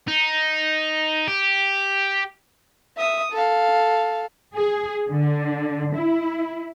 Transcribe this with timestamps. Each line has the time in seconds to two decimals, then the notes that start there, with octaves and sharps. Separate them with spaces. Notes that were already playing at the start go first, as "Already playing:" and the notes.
0.08 D#4
1.28 G4
2.97 E5 D#6
3.32 A4 F5
4.55 G#4
5.08 D3
5.95 E4